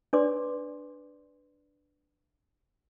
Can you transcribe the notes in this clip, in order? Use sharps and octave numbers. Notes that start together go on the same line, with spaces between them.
D4 B4 C#5 D5 C6 D6